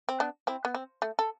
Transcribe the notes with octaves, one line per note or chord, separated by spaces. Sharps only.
C4
B3 D4
C4 E4
B3
C4
A3
A4